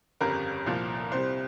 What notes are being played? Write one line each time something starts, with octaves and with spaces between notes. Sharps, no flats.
G1 F2 C#3 G3 A#4
C2 A#2 F3
C2 C3 G3 C5